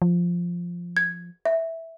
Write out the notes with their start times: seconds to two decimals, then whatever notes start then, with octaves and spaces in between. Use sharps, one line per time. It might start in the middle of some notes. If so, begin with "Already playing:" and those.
0.02 F3
0.97 G#6
1.46 E5